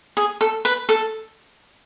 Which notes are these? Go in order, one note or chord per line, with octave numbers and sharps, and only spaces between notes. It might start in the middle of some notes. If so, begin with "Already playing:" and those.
G#4
A4
B4
A4